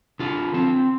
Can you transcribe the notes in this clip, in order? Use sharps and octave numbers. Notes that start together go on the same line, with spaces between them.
D3 F4
C4